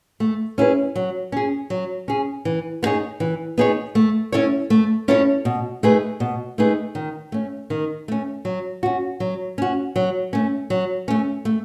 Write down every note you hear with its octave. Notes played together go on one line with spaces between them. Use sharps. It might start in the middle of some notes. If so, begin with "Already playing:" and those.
A3
C#4 E4 G#4 B4
F#3
C#4 G#4
F#3
C#4 G#4
E3
B3 D#4 G#4 C#5
E3
B3 D#4 G#4 C#5
A3
C#4 E4 A4 C#5
A3
C#4 E4 A4 C#5
B2
A3 D#4 G#4 B4
B2
A3 D#4 G#4 B4
D#3
A3 C#4
D#3
A3 C#4
F#3
C#4 F#4
F#3
C#4 F#4
F#3
A3 C#4
F#3
A3 C#4
A3